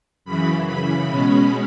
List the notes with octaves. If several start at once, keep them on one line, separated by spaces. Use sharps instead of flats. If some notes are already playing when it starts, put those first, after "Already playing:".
F#2 C#3 E3 B5
B5
B2 G#3 C#4